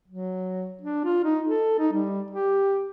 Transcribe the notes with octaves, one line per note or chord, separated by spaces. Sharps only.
F#3
D4
F4
D#4
A4
D#4
G3
G4